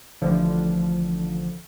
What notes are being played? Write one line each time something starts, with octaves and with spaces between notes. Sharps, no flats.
A1 D3 F3